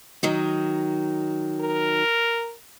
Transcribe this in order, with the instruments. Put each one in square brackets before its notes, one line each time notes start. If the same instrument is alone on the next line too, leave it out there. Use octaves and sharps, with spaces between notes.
[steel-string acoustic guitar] D#3 F#3 D#4
[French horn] A#4